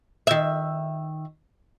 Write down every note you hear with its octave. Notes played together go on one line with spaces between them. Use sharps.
D#3 E5